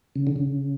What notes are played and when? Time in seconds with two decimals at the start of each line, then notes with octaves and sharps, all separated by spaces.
0.16 C#3
0.27 D3
0.36 C#3